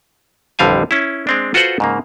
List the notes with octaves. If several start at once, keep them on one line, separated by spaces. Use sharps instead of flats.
A1 F2 D3 G3 F5 G#5
C#4 E4
G#3 C4 D4
F4 F#4 A4 B4 C5 F#5
G#2 C#3 A#3